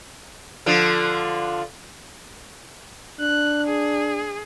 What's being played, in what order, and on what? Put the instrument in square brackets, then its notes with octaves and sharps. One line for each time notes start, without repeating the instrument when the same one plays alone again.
[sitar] D3 F3 F4
[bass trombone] D4 [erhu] F#6
[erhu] G#4